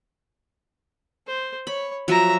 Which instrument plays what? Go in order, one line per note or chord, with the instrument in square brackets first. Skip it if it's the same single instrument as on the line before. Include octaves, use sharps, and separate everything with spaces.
[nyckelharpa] C5
[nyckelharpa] C#5 [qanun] B5
[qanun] F3 F#3 [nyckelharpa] E5 A#5